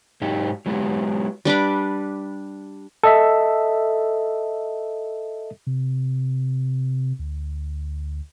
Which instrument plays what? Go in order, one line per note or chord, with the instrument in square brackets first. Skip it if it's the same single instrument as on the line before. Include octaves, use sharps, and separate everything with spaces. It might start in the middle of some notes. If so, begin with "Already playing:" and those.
[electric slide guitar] G#2 F#3 D#4 G4
F#3 G#3 B3 E4 G4
[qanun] G3 D4 B4 D6
[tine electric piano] A4 D#5 E5
[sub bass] C3
D2